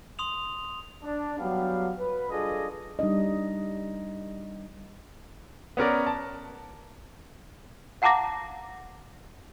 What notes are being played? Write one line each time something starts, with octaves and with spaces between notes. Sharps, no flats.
C6 D#6 F7
D4
F#3 G3 B3 G4 F5
B4
G2 F4 G#4 A4 D5 D#5
G3 D4 D#4 D#5
B3 C#4 A#4 D5
A5
F5 F#5 A5 A#5 D6 A#6